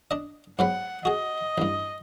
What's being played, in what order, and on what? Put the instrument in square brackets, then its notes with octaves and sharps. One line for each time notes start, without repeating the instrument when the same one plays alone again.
[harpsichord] D4 D#5
[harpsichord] G#2 F#3 B3 [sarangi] F#5
[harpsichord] F#4 G#4 [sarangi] D#5
[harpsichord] A1 G2